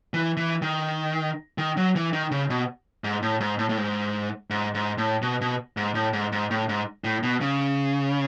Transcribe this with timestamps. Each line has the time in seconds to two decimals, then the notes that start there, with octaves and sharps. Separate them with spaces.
0.14 E3
0.37 E3
0.62 D#3
1.58 D#3
1.77 F#3
1.96 E3
2.13 D#3
2.31 C#3
2.50 B2
3.04 G#2
3.22 A2
3.40 G#2
3.59 A2
3.69 A2
3.78 G#2
4.50 G#2
4.74 G#2
4.98 A2
5.22 B2
5.41 B2
5.77 G#2
5.95 A2
6.13 G#2
6.32 G#2
6.51 A2
6.69 G#2
7.04 A2
7.23 B2
7.41 C#3